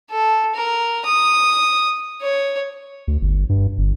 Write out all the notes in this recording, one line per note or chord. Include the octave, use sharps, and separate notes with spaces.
A4
A#4
D#6
C#5
D2
G1
G2
G1